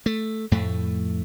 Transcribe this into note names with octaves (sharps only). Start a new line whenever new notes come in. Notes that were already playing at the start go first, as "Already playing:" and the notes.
A3
F2 A2 A3